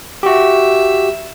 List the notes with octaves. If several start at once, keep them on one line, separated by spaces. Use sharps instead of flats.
F#4 G4 E5